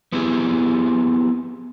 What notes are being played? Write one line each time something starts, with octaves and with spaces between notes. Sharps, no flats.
B3 C4 E4 G4 G#4